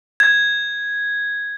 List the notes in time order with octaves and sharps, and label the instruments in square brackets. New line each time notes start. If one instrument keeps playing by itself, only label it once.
[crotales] G#6